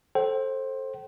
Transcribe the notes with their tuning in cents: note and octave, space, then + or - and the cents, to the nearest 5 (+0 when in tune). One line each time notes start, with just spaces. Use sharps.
A4 +0 C5 +20 G5 -40